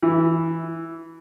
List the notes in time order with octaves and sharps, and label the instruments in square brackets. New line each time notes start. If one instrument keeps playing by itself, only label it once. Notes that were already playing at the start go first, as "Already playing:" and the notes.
[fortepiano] E3